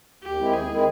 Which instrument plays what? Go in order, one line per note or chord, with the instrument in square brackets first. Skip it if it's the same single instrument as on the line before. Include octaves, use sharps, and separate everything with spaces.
[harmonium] D#2 [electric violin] G4
[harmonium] D#3 G#3 C4 E4
[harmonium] D#2 [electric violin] G#4
[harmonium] D#3 G#3 C4 E4